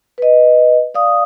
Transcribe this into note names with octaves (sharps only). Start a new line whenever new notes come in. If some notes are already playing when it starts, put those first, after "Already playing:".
B4 D#5
D5 F5 D#6